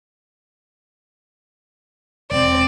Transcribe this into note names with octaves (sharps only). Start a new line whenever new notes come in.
E1 C4 D5